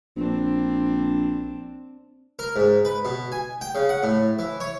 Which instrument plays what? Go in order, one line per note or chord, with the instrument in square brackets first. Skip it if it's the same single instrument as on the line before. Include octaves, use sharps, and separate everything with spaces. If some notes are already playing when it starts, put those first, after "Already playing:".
[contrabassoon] A#1 [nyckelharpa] C4 D4
[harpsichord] A#4
G#2
B4
B2
G#5
G5
C#3
F#5
A2
E3
C#5